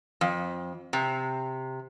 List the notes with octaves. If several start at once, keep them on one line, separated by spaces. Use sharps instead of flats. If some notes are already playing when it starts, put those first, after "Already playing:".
F2
C3